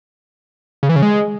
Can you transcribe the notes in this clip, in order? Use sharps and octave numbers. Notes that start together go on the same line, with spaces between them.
C#3
E3
C#3
G#3